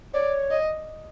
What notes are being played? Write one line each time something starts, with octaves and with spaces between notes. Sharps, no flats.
C#5 D5
D#5